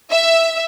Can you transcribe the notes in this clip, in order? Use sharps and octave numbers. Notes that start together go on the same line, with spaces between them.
E5